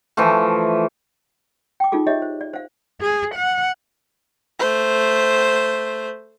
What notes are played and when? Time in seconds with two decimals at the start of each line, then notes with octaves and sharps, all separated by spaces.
0.17 E3 F3 A3
1.80 G5 D6
1.92 D#4 F4 G#4 A4 D6
2.07 G4 C#5 D#5 E5
2.22 C5
2.41 D5
2.54 C5 F5
3.01 G#4
3.35 F#5
4.59 A3 C5